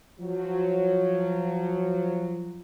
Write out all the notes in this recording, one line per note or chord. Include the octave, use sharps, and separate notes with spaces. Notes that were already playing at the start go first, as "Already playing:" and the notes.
F3 F#3